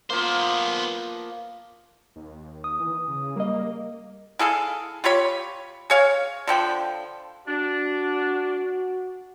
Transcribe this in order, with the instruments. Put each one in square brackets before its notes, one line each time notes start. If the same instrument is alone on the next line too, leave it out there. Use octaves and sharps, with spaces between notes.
[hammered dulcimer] F3 A#3 [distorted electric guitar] B3 C5
[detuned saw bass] D#2
[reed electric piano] D#6
[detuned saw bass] E3
C#3
[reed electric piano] G3 D#5 [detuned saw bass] A#3
[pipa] E4 G#4 A4 F5
F4 G4 C#5 B5
G#4 C#5 F5
D3 F3 G5 B5
[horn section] D4 [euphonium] F#4